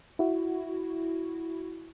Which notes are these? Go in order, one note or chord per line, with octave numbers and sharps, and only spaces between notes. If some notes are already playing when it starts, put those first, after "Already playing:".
E4 F#4